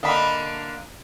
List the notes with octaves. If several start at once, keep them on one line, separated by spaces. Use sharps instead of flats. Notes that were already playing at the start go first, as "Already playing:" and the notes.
D3 A#3 D4 D#5 B5